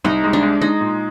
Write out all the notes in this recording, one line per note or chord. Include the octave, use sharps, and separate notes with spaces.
C2 D#4
G#3
D4
G#3
G#3 D#4
A#2